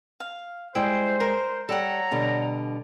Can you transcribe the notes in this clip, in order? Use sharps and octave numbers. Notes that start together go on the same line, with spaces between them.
F5
G3 G#3 E4 C5 G5
A#4
G3 A4 C#5 F#5 G5 A#5
B2 D3 G3